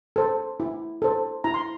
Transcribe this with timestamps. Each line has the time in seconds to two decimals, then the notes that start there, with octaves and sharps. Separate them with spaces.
0.16 A4 C5
0.60 E4
1.02 A4 C5
1.44 E4 A#5
1.54 C6